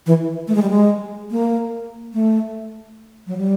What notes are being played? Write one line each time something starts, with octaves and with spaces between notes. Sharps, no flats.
E3
A3
G#3
G3
G#3
A#3
A3
F#3
G3